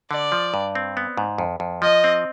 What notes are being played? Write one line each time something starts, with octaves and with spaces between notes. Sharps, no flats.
D3 D5
F3
G2
C4
B3
G#2
F2
F2
F3 D#5
C4